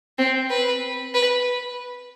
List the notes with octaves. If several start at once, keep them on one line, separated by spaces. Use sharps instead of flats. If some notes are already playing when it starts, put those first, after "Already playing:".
C4
B4
B4